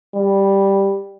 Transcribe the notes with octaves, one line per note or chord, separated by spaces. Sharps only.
G3